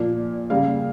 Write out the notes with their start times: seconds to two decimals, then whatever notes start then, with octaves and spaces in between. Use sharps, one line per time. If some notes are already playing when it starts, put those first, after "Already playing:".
Already playing: A#2 F3 A#3 D5
0.50 C#3 G3 A#3 F5